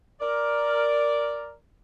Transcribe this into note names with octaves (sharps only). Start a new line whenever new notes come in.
A#4 D5